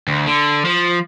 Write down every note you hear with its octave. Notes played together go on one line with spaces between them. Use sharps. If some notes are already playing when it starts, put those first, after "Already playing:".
D2
D3
F3